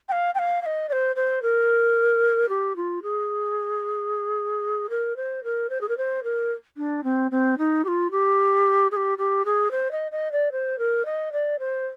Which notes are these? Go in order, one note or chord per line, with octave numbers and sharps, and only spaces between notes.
G5
F5
G5
F5
F5
D#5
D5
C5
C5
A#4
G4
F4
G#4
A#4
C5
A#4
C5
G#4
A#4
C5
A#4
D4
C4
C4
D#4
G4
F4
G4
G#4
G4
G4
G#4
C5
D#5
D#5
D5
C5
A#4
D#5
D5
C5